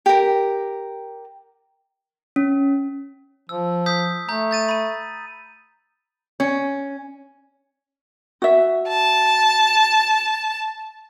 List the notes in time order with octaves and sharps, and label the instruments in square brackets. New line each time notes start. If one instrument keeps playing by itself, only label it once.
[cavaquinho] G4 A#4
[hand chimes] C#4
[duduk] F3 [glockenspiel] E6
[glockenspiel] D#6 G6 B6
[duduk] A3 [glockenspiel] A#5 G6
[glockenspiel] G6 A6 D#7
B5 D#7
[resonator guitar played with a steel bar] C#4
[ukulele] F#4 E5
[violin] A5